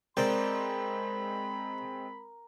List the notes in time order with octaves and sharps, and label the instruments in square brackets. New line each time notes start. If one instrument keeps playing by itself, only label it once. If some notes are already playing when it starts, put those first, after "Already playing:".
[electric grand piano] G#3 C4 [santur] A#4 [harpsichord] C5 D5 G5 [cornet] B5